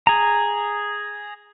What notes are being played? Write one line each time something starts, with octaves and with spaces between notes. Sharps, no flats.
G#4 A#5